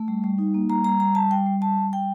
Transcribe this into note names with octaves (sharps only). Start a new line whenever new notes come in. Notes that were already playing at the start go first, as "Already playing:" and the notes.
Already playing: A3
G3
G3
D#4
A#3
G3 A#5
G3 A#5
G3 A#5
G3 A5
G3 G5
G3
G3 A5
G3
G3 G5